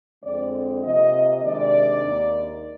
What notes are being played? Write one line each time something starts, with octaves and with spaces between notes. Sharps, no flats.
F2 D3 G#3 C4 D5
C3 F3 A#3 D#5
C3 D#3 G#3 D4 D5
D#2 D#3 A#3